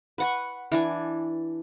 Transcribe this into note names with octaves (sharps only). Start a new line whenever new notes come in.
B4 F#5 C#6
E3 D4 G#5